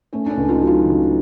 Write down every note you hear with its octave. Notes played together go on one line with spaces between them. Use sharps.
A3 C#4
D4
C#4
C#2
D#4 F4
F#3
D#4 F4
C#3